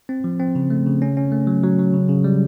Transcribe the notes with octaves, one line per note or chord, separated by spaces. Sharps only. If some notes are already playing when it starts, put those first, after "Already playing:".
C4
F3
C4
C#3
A3
C#3
C#4
C#4
A3
F#3
F#3
F#3
C#3
C#3
G3